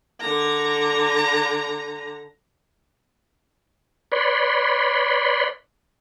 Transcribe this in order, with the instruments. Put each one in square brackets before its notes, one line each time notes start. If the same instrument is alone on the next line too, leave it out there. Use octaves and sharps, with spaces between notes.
[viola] D3 A#5
[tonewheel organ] B4 C#5 D5 B5 C6